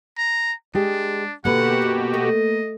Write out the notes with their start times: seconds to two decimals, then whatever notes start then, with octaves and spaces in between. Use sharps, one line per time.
0.17 A#5
0.75 G#3 D4 G4
1.45 B2 D3 A#3 F#4 G4 A4 B4 F#5
1.82 F#2
2.14 A3 D#5